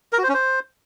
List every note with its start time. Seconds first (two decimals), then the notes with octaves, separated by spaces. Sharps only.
0.13 A#4
0.18 F#4
0.23 C5
0.29 C#4
0.34 C5